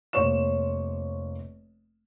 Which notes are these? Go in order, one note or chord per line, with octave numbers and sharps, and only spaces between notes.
F1 A#3 C5 C#5 C#6 E7